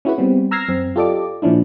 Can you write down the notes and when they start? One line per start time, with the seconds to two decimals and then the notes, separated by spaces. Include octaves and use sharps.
0.05 C#4 E4 F#4 G#4 B4
0.18 G3 B3 C4
0.51 A#5 E6 F6 G#6 A#6 C7
0.69 F#2 C4
0.96 F4 G4 A4 D5 D#5 D6
1.42 A#2 F3 C#4 D4 E4